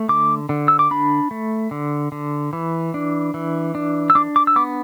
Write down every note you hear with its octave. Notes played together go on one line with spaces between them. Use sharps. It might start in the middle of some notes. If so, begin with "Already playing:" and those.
Already playing: A3
D3 D6
D3
E6
D6
D4 B5
A3
D3
D3
E3
D4
E3
D4
E6
D4 D6
D6
E6
B3 D6